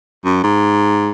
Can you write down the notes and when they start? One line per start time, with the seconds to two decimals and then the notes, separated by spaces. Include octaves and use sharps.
0.25 F#2
0.43 G#2